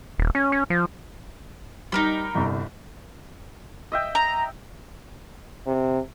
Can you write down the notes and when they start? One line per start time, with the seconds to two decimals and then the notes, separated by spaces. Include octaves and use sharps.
0.18 D#1
0.35 C#4
0.52 C#4
0.70 F3
1.92 G3 D#4 A#4 B5
2.35 G1 C2
3.92 D#5 E5 G5
4.15 A#5
5.66 C3